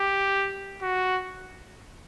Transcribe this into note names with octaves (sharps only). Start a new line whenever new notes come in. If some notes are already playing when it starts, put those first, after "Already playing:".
Already playing: G4
F#4